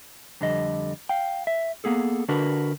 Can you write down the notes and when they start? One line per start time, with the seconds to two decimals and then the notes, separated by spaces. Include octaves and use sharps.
0.41 F2 D3 G3 D#5
1.09 F5 G5
1.47 E5
1.84 A#3 B3 G#4 A4
2.28 D3 D4 F#4 A#4 B4